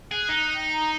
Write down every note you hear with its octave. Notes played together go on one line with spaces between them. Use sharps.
G#4 F#6
D#4
G5
A#5